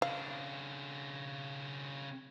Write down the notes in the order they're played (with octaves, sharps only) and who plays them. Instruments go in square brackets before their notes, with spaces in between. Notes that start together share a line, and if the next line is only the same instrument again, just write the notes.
[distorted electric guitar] C#3 D4 [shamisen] F5